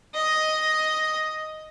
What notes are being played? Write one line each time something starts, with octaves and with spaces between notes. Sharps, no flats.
D#5